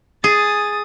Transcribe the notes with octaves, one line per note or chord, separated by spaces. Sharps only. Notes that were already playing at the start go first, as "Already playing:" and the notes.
G#4 D#6 A6